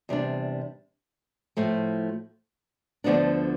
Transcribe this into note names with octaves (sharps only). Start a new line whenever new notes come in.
E2 C3 G3 D4
A2 F3 A3
D2 D3 F3 B3 D4